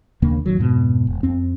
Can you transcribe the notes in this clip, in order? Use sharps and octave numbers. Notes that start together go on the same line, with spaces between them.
D#2 C#3 A#3 D4
A1 D#3 F#3
F2 G#2 B2
E1
F2 C4